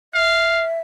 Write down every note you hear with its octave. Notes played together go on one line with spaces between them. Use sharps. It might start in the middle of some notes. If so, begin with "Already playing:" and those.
E5 F5